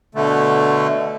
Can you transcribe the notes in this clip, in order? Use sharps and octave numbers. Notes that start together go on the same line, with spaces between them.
B2 D3 A3